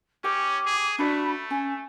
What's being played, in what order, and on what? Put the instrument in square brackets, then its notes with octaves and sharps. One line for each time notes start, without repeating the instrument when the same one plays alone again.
[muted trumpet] C#4 [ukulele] G4 G5 [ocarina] D6
[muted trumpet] G#4
[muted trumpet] A3 [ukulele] D4 F#4 D5 [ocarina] B5
[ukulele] C#4 [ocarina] G#5